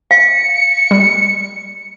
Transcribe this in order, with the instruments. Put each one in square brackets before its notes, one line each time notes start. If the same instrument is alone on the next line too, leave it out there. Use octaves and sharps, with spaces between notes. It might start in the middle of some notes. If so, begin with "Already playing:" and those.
[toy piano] F5 [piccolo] C#7
[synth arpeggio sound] G3